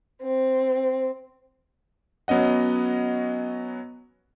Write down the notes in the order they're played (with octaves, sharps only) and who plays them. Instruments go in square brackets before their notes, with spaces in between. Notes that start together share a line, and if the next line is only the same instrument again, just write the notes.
[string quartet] C4
[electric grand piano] F#3 B3 C#4 D#5 F#5